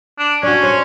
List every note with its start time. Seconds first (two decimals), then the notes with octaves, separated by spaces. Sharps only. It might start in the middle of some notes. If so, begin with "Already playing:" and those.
0.18 D4
0.43 C#4 D4 F#4
0.63 C5 C#5